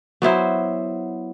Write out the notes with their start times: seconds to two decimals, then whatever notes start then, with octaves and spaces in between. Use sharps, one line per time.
0.22 F#3 B3 E4 C5